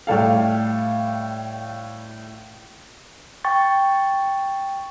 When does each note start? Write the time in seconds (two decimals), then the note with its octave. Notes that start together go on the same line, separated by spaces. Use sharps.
0.07 A2 G3 A4 F5
3.44 G5 C#6 A6